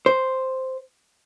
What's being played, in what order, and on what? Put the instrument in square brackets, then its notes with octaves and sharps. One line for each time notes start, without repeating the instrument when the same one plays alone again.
[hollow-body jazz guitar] C5